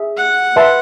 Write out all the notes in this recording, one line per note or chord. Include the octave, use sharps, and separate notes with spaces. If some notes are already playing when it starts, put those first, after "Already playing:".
Already playing: G#4 E5
F#5
B4 E5 A5 C6